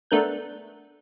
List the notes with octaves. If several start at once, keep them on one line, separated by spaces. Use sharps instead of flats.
A3 B3 D4 A#4 F#6 G6